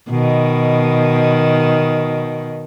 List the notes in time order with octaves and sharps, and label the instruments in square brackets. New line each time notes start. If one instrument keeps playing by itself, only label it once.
[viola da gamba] B2 D#3